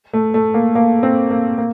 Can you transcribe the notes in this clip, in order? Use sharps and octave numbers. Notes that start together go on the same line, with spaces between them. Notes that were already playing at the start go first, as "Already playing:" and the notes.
A3
A3
A#3
A#3
C4
A#3
A#3